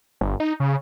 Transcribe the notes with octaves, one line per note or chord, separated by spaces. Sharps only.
G1
D#4
C#3